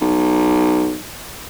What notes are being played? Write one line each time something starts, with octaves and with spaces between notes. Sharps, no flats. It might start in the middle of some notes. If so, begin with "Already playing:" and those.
B1